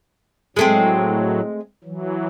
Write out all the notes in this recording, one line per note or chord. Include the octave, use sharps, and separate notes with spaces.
A2 F#3 G#3 A3 C4
E3 F#3